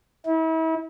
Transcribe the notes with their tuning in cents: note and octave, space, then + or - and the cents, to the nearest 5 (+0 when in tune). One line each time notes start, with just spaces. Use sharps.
E4 -40